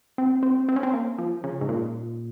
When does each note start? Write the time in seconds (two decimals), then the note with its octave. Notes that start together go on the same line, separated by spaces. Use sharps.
0.18 C4
0.43 C4
0.69 C4
0.76 C#4
0.83 C4
0.93 A#3
1.18 F3
1.44 C#3
1.61 G#2
1.69 A#2